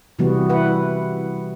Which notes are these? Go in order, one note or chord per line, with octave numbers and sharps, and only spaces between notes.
C3 E3 G3 B3 F#4
E4 B4 F#5